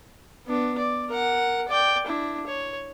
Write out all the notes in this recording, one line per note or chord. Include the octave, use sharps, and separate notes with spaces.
B3 D4
D5
A#4 F#5
D5 G5
D4 E4
C#5